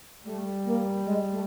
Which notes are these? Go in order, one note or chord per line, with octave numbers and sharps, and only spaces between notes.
G3 A3
A#3
G#3
A3